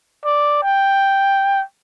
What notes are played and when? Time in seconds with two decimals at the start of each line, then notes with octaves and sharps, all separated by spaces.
0.25 D5
0.63 G5